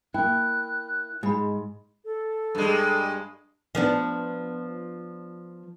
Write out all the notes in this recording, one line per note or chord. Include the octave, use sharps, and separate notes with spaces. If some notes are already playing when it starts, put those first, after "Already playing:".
A#3 E4 G5 F#6
G#2 G#3 E4 B5
A4
G2 G#3
F3 B3 D4